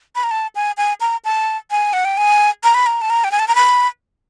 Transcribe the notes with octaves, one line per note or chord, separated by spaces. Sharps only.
B5
A#5
A5
G#5
G#5
A#5
A5
G#5
F#5
G5
G#5
A#5
B5
A#5
A5
A#5
G5
G#5
A5
A#5
B5